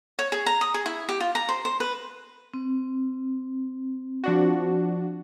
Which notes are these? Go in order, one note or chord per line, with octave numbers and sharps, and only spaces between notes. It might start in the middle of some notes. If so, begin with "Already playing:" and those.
C#5
G#4
A#5
D#6
G#4
E4
G4
F4
A#5
C5
C5
B4
C4
F3 D4 F#4